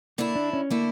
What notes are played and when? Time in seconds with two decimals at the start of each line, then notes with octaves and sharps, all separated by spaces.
0.18 D3 A3 A#3 E4
0.36 D4
0.53 C#4
0.70 D3 A3 A#3 E4